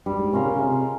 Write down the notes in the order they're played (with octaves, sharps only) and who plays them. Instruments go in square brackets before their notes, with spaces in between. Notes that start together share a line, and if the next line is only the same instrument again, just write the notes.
[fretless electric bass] G2 [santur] G3
[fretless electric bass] G#2
[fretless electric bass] C3 [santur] C#4 F4 A#4
[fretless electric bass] C#3
[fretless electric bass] C3 [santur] G#3